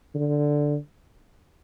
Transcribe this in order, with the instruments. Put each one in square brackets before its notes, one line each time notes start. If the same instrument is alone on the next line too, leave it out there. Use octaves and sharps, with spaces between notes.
[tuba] D3